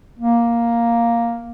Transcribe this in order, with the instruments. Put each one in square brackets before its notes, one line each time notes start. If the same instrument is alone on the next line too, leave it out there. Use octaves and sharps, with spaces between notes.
[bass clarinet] A#3